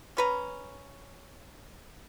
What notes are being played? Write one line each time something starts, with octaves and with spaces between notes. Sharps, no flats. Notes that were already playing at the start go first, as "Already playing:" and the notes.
C#4 B4 A#5